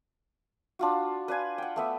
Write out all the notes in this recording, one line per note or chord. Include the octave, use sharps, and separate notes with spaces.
D4 F4 F#4
B4 D5 F5 G#5
F#5 G5
A3 B3 E5